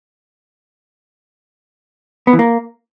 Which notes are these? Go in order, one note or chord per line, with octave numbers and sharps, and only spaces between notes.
B3
E3
A#3